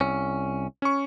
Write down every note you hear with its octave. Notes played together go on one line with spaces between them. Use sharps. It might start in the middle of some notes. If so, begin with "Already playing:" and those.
C2 C#4
C#4 C#6